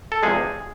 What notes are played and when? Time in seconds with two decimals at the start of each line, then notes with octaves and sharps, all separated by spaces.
0.12 A4
0.23 E2 C3 F3 G#3 G#4